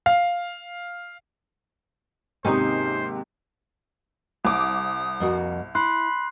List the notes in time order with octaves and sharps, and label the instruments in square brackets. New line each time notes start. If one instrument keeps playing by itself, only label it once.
[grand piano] F5
[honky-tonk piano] D#2 G#2 C3 [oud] C#4 D#4 [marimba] G4 [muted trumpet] C5
[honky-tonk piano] C2 D6 [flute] D#6
[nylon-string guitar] F2 A#3 F#4
[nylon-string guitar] E4 [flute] B5 [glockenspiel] C6 F#6 C7